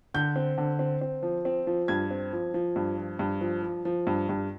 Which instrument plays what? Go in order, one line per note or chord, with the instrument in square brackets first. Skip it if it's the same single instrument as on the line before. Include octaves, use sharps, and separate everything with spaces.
[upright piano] D3 G6
C4
D3
C4
C4
F3
C4
F3
G2 G#6
C4
F3
F3
G2
F3
G2
F3
F3
F3
G2
G2